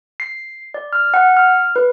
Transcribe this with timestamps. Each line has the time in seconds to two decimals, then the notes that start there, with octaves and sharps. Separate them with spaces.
0.20 C7
0.74 D5
0.93 F6
1.14 F#5
1.37 F6
1.76 B4